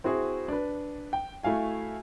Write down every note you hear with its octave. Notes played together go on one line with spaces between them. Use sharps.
C4 E4 F#4 G#4 C5
D4 B4
G5
A3 E4 F#4 F5 G#5